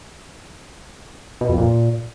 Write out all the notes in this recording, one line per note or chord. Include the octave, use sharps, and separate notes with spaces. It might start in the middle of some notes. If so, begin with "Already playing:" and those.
B2
F2
A#2